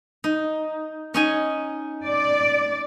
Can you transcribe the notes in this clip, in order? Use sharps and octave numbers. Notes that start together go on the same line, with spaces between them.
D#4
C#4 D#4 G#5
D5